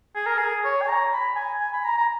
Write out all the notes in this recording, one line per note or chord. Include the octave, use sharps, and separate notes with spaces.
G#4
A#4
G#4
C#5
G#5
A#5
B5
G#5
G#5
B5
A#5
A#5